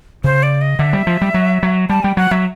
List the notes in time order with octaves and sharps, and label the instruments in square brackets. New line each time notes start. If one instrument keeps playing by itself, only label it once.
[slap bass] C#3 [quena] C5
[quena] D5
D#5
[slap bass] D3 [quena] E5
[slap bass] G3
F3
G3
F#3
F#3
[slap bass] G3 [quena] A5
[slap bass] G3 [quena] G5
[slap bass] F#3 [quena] F#5
[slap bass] F#3 [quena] E5